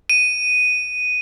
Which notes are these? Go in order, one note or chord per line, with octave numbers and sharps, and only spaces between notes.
D#7